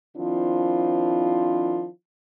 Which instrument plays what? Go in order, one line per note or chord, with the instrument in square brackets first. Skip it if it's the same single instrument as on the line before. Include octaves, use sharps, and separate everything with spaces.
[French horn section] D#3 F3 C4 D4 E4 F4